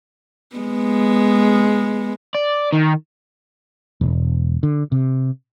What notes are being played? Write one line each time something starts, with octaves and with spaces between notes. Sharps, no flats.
G#3 B3
D5
D#3
E1
D3
C3